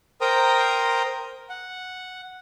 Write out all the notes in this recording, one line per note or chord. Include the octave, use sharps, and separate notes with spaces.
A#4 C5 G5 A#5 D#6
F#5